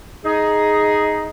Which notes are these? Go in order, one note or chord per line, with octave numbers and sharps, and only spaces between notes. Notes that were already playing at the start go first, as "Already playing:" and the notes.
D#4 G#4